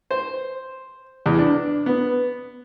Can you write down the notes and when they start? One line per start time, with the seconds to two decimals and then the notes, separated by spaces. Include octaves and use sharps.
0.11 C5
1.26 E2
1.39 D4
1.86 B3